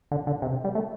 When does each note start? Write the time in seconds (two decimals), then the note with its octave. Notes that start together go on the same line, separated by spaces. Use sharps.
0.12 D3
0.27 D3
0.42 C3
0.64 G3
0.75 A3